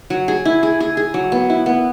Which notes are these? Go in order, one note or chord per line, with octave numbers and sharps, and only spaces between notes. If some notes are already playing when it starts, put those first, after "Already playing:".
F#3
G#4
E4
G#4
G#4
G#4
F#3
B3
E4
B3